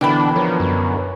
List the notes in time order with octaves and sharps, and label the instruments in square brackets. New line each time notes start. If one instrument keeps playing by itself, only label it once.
[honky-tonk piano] B2 D3 E3 [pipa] A#3 G5 B5 [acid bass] D4
[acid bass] F3 [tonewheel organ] A#4 B4 C#5
[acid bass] F#2